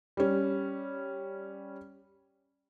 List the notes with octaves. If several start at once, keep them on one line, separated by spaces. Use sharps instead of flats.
G3 C#4